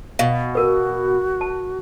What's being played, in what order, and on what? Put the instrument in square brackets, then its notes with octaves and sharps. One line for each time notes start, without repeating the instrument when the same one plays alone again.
[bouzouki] B2 [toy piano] F5
[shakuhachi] F#4 [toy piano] A#4 B4
[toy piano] A5